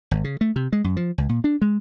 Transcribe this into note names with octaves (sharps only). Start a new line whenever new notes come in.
G#1
C#3
A3
C3
G#3
F#2
F3
C#2
A#2
D4
G#3